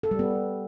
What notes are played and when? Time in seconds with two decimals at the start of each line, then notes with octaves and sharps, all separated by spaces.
0.03 A4
0.11 G3
0.19 B3